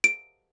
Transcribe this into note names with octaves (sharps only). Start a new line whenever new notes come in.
D7